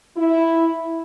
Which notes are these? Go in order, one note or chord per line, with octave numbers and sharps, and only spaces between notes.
E4